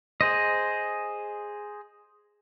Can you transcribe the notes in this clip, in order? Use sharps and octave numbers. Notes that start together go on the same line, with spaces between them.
G#4 C5 D#5